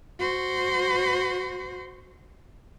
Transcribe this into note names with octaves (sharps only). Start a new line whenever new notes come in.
F#4 C5